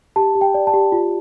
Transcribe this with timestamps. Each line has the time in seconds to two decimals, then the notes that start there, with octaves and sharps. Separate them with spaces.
0.16 G4 A5
0.35 G4
0.41 G5
0.54 D5
0.67 A5
0.74 G4
0.92 F4